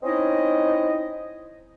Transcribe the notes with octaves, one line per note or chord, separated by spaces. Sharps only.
C4 C#4 D#4 E4 D#5